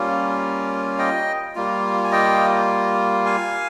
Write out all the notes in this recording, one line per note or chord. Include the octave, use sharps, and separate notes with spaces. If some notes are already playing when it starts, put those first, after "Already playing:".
Already playing: G3 A#3 C#4 F4
D#5 G5
G3 A#3 F4
G#5
D#5 G5
F5 G#5